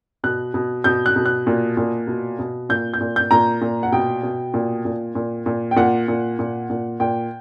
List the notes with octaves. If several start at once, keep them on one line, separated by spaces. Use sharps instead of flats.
B2 F#6
B2
B2 G6
F#6
B2
F#6
A#2
A#2
B2
B2
A#2 G6
G6
A#2
G6
A#2 A#5
A#2
F#5
B2 G5
B2
A#2
A#2
A#2
A#2
G5
A#2 F#5
A#2
A#2
A#2
A#2 G5